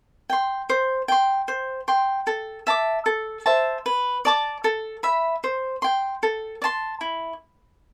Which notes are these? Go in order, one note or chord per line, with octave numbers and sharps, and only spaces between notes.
G5 C6
C5
G5 C6
C5
G5 C6
A4
E5 A5 D6
A4
C5 E5 A5
B4
D5 A5 D6
A4
E5 B5
C5
G5 C6
A4
D5 A5 C6
E4